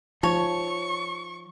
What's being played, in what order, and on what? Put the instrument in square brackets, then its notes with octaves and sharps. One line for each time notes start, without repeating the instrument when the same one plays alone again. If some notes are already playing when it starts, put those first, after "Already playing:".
[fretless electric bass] F3 [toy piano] D#4 [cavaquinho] C#5 [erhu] C#6